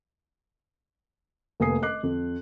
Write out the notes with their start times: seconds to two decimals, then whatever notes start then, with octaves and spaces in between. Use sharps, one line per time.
1.60 F1 A#3 B3 G#5 D#6 C7
1.82 D#5 D6 F#6 C7
2.03 F2